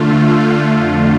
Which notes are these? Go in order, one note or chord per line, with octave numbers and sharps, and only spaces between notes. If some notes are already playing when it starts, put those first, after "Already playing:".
Already playing: D3 A3 F4
F2 D3 A3 F4